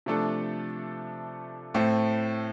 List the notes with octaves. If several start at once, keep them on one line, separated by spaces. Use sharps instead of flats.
C3 F3 A3 D4 A4
A2 A3 C4